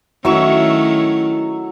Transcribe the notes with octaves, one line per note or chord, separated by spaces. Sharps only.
D#3 F#3 A3 C#4 E4 C#6 E6